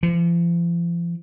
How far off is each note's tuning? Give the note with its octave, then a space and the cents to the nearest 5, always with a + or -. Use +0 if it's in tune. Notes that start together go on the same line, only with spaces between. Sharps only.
F3 -40